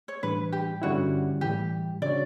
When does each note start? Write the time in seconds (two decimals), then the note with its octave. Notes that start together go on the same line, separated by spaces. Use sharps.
0.08 C#5
0.23 A2 E3 G3 D4 B4
0.52 G4
0.82 G2 D3 G3 C#4 E4 F#4
1.41 A2 E3 G3 G4
2.02 C#3 G3 D4 F#4 C#5 D5